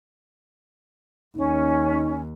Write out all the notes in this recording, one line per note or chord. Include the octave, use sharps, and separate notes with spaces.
D#2 C#4 D#4